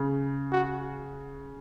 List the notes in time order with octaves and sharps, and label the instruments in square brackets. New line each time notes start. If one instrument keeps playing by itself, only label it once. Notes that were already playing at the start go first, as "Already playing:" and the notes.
Already playing: [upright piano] C#3
[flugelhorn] F#4